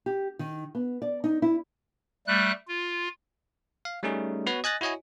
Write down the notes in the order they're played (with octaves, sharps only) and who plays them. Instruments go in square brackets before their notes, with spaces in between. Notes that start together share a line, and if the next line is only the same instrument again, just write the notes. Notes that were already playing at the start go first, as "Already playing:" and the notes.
[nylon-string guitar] G4
D#3
B3
D5
D#4
E4
[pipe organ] G3 A3 F#6
F4
[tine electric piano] F5
G3 A3 C#4 D#4 G#4
B3 F#4 B4 C#5
D#5 G#5 F#6 A6 A#6
E4 F#4 C#5 D#5 G#5